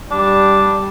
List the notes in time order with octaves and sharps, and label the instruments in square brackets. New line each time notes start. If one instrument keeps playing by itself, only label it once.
[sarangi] G3 [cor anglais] D4